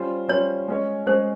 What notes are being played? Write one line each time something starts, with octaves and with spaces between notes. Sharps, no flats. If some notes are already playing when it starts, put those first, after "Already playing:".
Already playing: G3 C#4 F4 C5
G3 C#4 F4 C5 C#5
G#3 C#4 G#4 C#5
G#3 C#4 G#4 C5 C#5